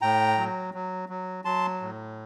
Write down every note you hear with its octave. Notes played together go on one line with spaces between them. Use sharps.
A2 G5 A#5
F#3
F#3
F#3
F#3 A5 C6
A2